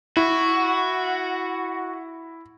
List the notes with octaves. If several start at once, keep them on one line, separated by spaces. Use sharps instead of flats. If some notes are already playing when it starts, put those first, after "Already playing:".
E4 F#4